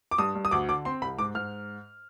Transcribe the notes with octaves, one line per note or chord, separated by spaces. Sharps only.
D6
G2 D#6
G2
D#6
D2 D6
D3 D6
C4 C6
C2 B5
G#2 D6
G#2 F6